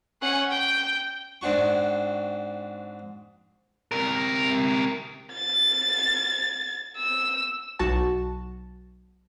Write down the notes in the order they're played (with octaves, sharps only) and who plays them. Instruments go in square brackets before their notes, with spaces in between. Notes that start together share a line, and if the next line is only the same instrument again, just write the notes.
[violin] C#4 F#5
G5
[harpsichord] G#2 C4 D4 F#4 C#6
[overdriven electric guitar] C3 A#4
[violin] A6
E6
[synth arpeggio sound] B1 F#4 A5